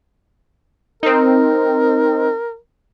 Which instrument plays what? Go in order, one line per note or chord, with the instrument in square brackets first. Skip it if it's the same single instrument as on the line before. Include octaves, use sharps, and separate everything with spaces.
[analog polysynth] C4 D#4 [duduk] A#4